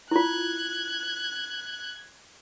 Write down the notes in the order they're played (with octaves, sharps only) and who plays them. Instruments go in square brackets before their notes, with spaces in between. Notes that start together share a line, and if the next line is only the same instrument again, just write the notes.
[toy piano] E4 F4 [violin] F#6 G#6